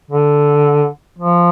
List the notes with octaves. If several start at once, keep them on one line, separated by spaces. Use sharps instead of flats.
D3
F3